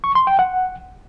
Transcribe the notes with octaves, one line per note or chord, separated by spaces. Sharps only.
C#6
C6
G5
F#5